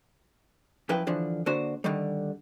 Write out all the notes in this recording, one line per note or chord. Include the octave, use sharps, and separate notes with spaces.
F#2 F3 E4 B4 G5
D3 E3 F3 D4
D3 A#3 D4 F#4 C5
D3 D#3 G3